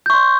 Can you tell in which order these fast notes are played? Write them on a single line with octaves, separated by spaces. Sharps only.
G6 C#6 C6